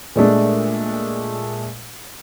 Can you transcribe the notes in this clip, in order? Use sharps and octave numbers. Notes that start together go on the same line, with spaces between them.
A#2 G#3 A3 D4